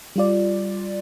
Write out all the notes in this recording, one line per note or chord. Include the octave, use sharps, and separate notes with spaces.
G3 F4 D5